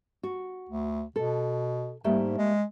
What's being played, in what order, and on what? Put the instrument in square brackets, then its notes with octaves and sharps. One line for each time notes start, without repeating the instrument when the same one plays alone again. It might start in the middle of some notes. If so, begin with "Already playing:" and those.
[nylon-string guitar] F#4
[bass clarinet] D2
[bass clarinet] B2 [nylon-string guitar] A4
[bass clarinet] G#2 [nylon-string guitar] G3 A3 A#3
[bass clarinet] G#3